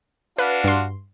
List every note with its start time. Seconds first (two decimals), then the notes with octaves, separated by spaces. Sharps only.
0.38 D4 F#4 B4 F5
0.64 G2 C6